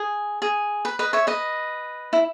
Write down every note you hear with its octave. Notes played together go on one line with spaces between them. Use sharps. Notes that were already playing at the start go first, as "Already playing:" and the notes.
Already playing: G#4
G#4
B4
B4 D#5
C#5 E5
B4 D#5
E4